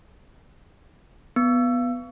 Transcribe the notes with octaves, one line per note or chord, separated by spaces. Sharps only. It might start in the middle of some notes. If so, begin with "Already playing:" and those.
B3